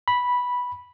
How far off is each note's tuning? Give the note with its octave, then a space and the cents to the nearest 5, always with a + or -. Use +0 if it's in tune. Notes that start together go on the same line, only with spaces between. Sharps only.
B5 -5